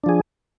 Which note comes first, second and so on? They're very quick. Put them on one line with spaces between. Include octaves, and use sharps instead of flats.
D4 F3 G#4